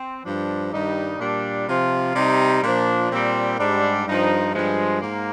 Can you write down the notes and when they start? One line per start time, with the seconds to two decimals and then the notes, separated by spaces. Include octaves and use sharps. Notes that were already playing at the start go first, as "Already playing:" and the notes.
Already playing: C4
0.24 G2 F3 D4
0.72 G2 D#3 G3 D#4
1.19 A#2 G3 D4
1.67 C3 F3 F4
2.15 C3 G3 D#4
2.63 A#2 F3 D4
3.11 A#2 G3 C4
3.58 G#2 G3 D4
4.06 G2 F3 D#4
4.54 G2 F3 G#3
5.02 G#2 A#3